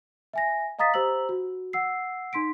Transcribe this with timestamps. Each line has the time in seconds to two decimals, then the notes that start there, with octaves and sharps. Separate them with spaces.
0.33 E5 G#5 A#6
0.79 D#5 F5 A#5 D#6 A6 B6
0.94 G4 C5 A#5 E6 F#7
1.29 F#4
1.73 F#5 E6 C7
2.33 D#4 C6 B6 D7